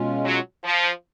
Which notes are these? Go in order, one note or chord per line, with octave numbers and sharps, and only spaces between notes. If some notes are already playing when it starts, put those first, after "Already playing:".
Already playing: B2 G#3 C#4 F4
F#3
F3